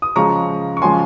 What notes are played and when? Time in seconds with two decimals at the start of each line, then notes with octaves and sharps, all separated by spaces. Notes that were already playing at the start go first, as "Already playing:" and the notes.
0.02 D#6
0.16 C#3 F3 G#3 A#5 C#6
0.77 C#6
0.82 C#3 F3 G#3 G#5 C6